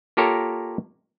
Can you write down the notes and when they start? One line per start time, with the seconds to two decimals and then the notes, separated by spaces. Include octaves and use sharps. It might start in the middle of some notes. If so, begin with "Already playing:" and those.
0.17 A#3 F4 G4 A4 A#4 C#5